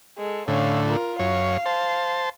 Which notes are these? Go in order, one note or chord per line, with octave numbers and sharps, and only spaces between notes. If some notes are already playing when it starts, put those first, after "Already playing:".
G#3 A4
A2 D3 C#4 F5
F4 A#4
F#2 C#5 F5
C5 A5